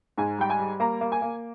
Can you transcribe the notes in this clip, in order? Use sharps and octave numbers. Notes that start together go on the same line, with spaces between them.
G#2 G#5
G3 G5
G#5
G3
A#3 A#5
A#3
G#5
A#3